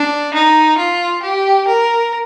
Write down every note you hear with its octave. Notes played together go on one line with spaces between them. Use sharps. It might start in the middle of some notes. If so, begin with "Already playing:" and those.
Already playing: D4
D#4
F4
G4
A#4